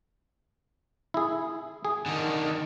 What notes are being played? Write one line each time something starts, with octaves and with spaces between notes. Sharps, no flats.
E4 G#4
G#4
D3 D#3